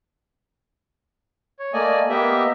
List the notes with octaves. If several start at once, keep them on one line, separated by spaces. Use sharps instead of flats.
C#5
A3 A#3 D5 D#5 G#5
A#3 B3 G4 D#5 E5